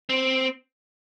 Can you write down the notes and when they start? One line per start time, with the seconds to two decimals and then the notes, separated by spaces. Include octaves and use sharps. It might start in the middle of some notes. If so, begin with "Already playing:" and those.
0.09 C4